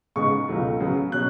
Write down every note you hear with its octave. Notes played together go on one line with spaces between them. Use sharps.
C#3 G#3 B3 D#4 C#6
C#2 B2 F#3 A3
C#3 F#3 B3
B2 F#3 C#4 F#6